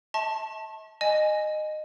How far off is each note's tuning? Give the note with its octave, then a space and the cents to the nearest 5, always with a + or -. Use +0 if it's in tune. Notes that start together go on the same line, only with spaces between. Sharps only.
E5 -45 A5 +0 C#6 -45
D#5 -20 G#5 +0